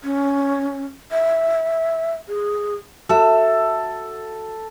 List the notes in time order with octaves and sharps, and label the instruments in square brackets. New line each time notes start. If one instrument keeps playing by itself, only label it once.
[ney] C#4
E5
G#4
[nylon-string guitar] F#4 E5 [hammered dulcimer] A4